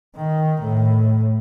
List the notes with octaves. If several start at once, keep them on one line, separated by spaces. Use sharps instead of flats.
D#3
A2